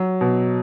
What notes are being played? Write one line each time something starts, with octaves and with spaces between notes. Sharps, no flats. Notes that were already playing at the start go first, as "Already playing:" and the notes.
Already playing: F#3
B2